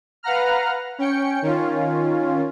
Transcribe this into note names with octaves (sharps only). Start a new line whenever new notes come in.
B4 F5 F#5 A#5 F6
C#4 G5 C#7
D#3 C#4 F4